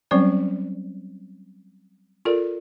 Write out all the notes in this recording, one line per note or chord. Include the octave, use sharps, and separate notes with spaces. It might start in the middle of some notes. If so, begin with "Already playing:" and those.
F#3 G3 C4 C#4 C5 D5
F4 A4 A#4 D5